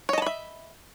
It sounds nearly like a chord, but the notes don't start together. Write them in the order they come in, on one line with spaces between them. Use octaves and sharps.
C#5 D#5 A5 B5 E5